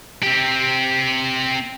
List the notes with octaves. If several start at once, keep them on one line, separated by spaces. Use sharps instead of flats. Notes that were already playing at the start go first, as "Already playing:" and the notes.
C4 G4